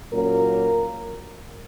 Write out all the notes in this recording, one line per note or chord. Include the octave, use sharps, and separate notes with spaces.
A#2 F#3 A#3 C#4 A#4